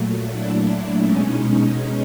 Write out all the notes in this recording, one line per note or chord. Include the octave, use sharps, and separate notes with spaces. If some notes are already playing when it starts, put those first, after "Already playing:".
Already playing: A#2 F#3 A3
D4 E4
B2 G#3 C#4 D#4
C#4 D#4
C#4 D#4